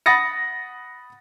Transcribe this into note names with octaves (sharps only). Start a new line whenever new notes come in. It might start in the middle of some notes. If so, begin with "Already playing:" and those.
F#5 B5 D#6 A6 A#6 C#7